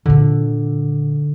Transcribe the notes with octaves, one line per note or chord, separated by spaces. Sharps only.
A#2 D3 F4